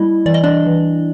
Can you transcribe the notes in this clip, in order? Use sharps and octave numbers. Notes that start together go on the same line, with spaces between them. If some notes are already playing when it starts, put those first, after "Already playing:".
Already playing: G3 A#3 E4 D#5
E3 D5
D#5
D4 D5
E3